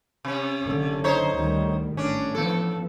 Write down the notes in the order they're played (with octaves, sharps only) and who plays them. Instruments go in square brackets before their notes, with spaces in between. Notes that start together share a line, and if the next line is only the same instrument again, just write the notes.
[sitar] C3 C#4
[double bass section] F#1 D3
[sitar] D#4 C5 C#5
[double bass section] D2 D#3 G3
[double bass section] A1 [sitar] C#4 D4
[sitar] E3 A4 [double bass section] F3 B3